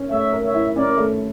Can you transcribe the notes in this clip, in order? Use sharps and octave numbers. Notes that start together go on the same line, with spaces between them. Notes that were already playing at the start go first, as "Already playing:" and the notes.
Already playing: C#4 A#4
A3 C#5 E5
A#4
C#5 E5
E4
C#4 A#4 D5
A3